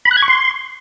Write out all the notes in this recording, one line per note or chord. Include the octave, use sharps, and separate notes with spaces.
B5
F#6
G#6
C#6
C6